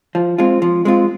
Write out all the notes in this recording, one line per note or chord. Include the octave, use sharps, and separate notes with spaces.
F3
G#3 C4 F4
F3
G#3 C4 F4